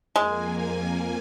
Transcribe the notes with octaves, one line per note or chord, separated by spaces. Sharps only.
F2 G#3 A#3 G#5